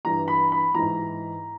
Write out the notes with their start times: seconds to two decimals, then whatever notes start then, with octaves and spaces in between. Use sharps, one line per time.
0.05 G2 E3 A#5
0.28 B5
0.52 B5
0.75 G#2 E3 A#5